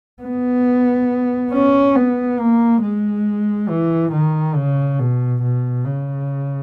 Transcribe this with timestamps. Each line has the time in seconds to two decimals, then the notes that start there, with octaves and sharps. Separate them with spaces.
0.22 B3
1.52 C#4
1.95 B3
2.39 A#3
2.82 G#3
3.69 E3
4.12 D#3
4.55 C#3
4.99 B2
5.42 B2
5.85 C#3